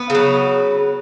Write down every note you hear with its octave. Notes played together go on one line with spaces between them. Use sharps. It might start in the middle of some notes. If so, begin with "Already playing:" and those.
Already playing: B3
C#3 F#3